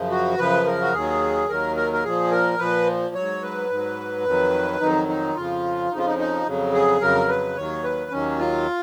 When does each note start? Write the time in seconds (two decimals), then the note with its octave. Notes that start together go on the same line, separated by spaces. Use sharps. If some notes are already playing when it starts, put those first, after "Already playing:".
Already playing: F#2 C#3 F3
0.11 F#4
0.38 F#2 C#3 F3 B4
0.66 A#4
0.82 F#4
0.94 D#2 D#3 F#3 G#4
1.49 D#2 D#3 F#3 A#4
1.76 A#4
1.93 A#4
2.04 A#2 F3 G#4
2.31 A#4
2.59 A#2 F3 B4
3.15 G#2 F#3 C#5
3.42 B4
3.70 G#2 F#3
4.25 F2 D#3 F#3
4.80 F2 D#3 F#3 D#4
5.08 D#4
5.36 F2 C#3 F3 F4
5.91 F2 C#3 F3 D#4
5.98 F4
6.06 D#4
6.18 D#4
6.46 F2 C#3 F#3
6.74 G#4
7.01 F2 C#3 F#3 A#4
7.28 B4
7.56 D#2 D#3 F#3 C#5
7.84 B4
8.11 D#2 D#3 F#3 C#4
8.39 F4